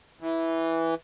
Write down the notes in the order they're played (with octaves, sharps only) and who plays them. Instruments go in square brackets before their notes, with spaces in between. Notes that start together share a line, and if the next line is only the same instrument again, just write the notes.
[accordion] E3